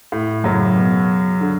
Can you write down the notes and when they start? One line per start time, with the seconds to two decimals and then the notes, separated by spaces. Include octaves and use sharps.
0.12 A2
0.44 F#2 A2 C#3 F#3
0.76 B2
1.41 D3